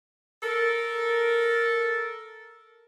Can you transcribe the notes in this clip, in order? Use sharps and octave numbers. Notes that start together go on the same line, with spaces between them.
A4 A#4